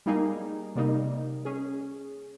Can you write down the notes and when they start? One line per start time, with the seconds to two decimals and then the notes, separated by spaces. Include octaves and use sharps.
0.06 G3 A#3 D#4 G#4
0.75 C3 G3 A#3 D#4
1.45 C#4 G#4